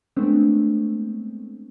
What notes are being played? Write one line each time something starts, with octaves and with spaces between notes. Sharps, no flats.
G#3 A3 B3 C4 D4